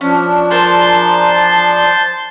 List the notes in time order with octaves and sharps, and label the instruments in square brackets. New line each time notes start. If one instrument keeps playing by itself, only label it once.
[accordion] F3 D4 [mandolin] C#4
[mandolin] G#4 A#4 C5 [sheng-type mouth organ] A5 C6 G6